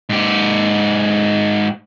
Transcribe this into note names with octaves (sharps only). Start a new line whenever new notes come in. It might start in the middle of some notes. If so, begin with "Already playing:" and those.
G#2 G4